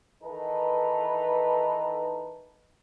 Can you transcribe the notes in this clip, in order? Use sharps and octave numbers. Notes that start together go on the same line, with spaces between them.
D#3 E3 D#4 A4 B4